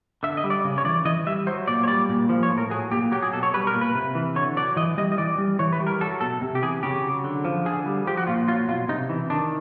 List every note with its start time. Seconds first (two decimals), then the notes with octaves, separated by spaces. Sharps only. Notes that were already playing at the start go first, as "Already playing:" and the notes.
0.23 D3 E5
0.37 D#5
0.44 G3
0.50 D5
0.65 C#3
0.78 C#5
0.85 E3 D5
1.05 E3 D#5
1.27 G3 E5
1.47 F#3 C5
1.68 A#2 D5
1.84 C#5
1.88 G3 D5
2.09 A#2
2.29 F3
2.43 C#5
2.50 A2
2.58 A#4
2.70 F#3 G#4
2.91 A#2 G4
3.12 F#3 G4
3.23 G#4
3.33 B2 A4
3.43 C#5
3.54 G3 B4
3.67 A#4
3.74 A#2
3.81 B4
3.95 C3
4.15 E3
4.36 D3 C#5
4.57 F#3 D5
4.76 E3 D#5
4.97 G3 D#5
5.12 D#5
5.18 E3 D5
5.38 G3
5.59 E3 C#5
5.73 B4
5.80 G3
5.87 A#4
6.01 F#3 A4
6.21 B2 A4
6.41 C3
6.55 G4
6.62 E3 G#4
6.83 C#3 G4
7.04 F#3
7.24 D3
7.45 F3
7.65 D3 G#4
7.86 G3
8.07 F3 G4
8.17 F#4
8.27 A#2 F4
8.48 F#3 F4
8.69 B2 F4
8.89 C3 D#4
9.09 E3
9.30 D#3 D4